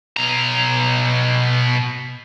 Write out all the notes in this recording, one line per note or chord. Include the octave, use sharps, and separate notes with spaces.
B2 A#5